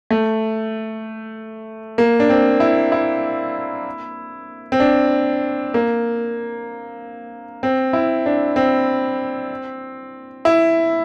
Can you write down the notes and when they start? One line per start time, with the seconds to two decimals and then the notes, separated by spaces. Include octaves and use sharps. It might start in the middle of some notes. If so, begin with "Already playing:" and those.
0.11 A3
1.98 A#3
2.20 D4
2.30 C4
2.60 E4
2.92 E4
4.72 C4
4.80 D4
5.74 A#3
7.63 C4
7.93 E4
8.26 D4
8.56 C4
10.45 E4